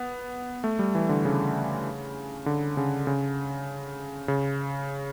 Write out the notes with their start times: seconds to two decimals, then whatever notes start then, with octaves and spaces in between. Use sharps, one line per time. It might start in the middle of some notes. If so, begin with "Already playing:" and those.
Already playing: B3
0.64 A3
0.79 G3
0.95 E3
1.09 D3
1.25 C#3
2.46 D3
2.77 C#3
3.07 C#3
4.28 C#3